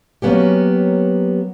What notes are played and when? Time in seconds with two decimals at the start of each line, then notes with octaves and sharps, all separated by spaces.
0.22 F#3 A#3 B3 C#4 G4